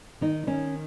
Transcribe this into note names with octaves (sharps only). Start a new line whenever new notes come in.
D#3 D#4
D#3 C#4